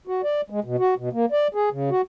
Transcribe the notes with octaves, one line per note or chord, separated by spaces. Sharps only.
F#4
D5
G#3
B2
F#4
B2
A#3
D5
G#4
C#3
F#4